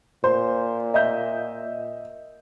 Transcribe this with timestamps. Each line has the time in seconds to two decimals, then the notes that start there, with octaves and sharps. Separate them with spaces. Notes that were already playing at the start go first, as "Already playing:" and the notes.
0.24 A#2 C5
0.94 D#5 E5 G6